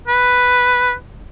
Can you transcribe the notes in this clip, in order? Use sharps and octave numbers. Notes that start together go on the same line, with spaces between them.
B4